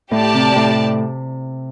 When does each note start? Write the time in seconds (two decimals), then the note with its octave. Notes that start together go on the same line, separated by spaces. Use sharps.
0.11 A2 G4 D5 A5
0.34 C3
0.56 A2